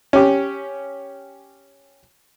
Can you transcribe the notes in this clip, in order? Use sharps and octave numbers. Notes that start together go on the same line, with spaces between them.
C#4 G4